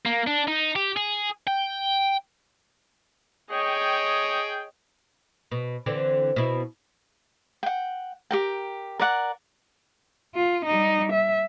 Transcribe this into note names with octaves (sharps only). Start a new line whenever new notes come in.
A#3
D4
D#4
G4
G#4
G5
G#4 C#5 D#5 G5
B2
D3 E3 C4
B2 E4
F#5 G5
G4 A#4 G5
A#4 D5 F#5
F4
G3 D#4
E5